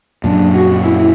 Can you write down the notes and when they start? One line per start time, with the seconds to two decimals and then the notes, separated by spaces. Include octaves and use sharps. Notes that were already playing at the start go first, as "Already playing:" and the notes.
0.24 F#2 A#2 D4
0.54 F#4
0.84 E4